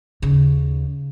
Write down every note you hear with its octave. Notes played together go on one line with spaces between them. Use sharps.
D#2 C#3